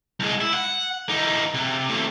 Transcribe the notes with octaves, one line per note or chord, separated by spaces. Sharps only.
C2 G#3
E4
F#5
E3 D#4
C3
A2 C3